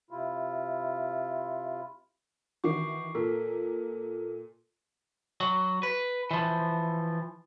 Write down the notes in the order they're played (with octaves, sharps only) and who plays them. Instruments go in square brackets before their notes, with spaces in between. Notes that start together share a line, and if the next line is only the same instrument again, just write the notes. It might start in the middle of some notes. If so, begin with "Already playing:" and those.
[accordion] C3 E4 F4
[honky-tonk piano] D#3 E3 F#4 [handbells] C#6 D6 C7
[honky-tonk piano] A#2 [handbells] A4 A#4
[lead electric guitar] F#3
B4
E3 F3